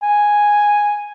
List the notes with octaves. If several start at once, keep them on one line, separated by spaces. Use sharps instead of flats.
G#5